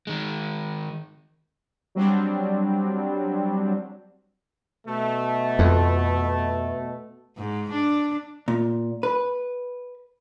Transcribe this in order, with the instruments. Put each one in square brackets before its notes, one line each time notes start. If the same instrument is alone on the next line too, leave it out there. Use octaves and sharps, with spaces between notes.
[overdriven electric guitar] D#3 G#3
[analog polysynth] F#3 G3 C4 D4
[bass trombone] B2 [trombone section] A3
[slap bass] F2
[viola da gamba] G#2
D4
[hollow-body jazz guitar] A#2
B4